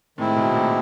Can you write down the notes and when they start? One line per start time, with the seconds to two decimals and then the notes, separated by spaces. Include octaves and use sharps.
0.18 A2 D#3 G#3 C4 E4
0.36 B2
0.48 A2
0.55 A#2